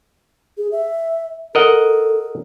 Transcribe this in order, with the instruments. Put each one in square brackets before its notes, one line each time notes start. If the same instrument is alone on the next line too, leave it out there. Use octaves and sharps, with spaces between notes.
[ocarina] G#4
E5
[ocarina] A4 [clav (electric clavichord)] A#4 D#5 F#5